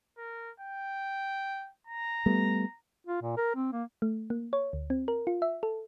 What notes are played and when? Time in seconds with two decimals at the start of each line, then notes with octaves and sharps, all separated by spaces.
0.18 A#4
0.60 G5
1.87 A#5
2.26 G3 A3 B3
3.07 F4
3.22 A#2
3.37 A#4
3.55 C4
3.72 A#3
4.02 A3
4.30 A#3
4.53 C#5
4.73 D2
4.90 C4
5.08 A#4
5.27 F4
5.42 E5
5.63 A4